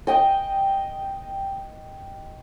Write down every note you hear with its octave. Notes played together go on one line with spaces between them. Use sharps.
D#5 G5